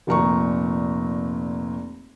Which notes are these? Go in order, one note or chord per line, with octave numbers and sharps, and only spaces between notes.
F1 A#2 A#5 C#6